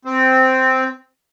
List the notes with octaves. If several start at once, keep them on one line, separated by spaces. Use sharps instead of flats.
C4